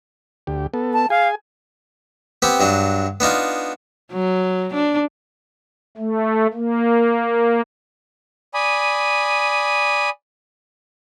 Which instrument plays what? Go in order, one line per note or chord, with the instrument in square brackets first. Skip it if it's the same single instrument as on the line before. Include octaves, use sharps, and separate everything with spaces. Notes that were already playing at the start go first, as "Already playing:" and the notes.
[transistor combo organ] D2 G4
B3 A4
[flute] A5
[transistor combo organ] G#4 G#5 [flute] F5
[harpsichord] B3 C4 G4
G2 F#3 D4
B3 D4 D#4 F4
[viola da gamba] F#3
D4
[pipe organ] A3
A#3
[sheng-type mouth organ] D5 G#5 B5 D#6